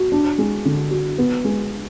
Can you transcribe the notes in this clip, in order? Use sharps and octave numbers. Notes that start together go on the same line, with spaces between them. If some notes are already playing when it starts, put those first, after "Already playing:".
Already playing: F#4
D4
G#3
D3
F#4
B3
G#3